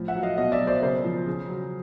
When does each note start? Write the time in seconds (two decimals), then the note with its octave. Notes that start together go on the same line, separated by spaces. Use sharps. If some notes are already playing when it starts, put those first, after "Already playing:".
Already playing: A2 F3
0.08 E5 F#5
0.16 F#3
0.23 D#5 F5
0.37 B2 D#5 F5
0.52 D5 E5
0.60 F#3
0.67 C5 D5
0.82 C#3 A#4 C5
1.04 F3
1.26 C#3
1.48 F#3